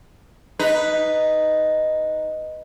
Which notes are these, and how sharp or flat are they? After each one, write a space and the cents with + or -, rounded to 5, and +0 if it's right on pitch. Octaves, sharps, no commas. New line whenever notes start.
D#4 +0 B4 +0